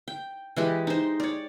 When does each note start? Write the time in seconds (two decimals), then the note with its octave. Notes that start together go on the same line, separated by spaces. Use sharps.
0.08 G5
0.56 E3 G#3 G4
0.87 D#4 C5
1.20 C#5 D5